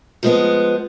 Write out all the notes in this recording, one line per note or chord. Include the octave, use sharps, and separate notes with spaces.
F3 G#3 B3